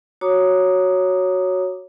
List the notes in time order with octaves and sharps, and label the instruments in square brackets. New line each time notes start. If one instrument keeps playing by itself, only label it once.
[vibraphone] F#4 C#5 A#5 D6 D#6